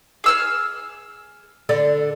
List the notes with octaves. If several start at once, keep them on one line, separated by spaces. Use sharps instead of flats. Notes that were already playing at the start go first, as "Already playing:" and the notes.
G#4 E6 F6
D3 A4 D5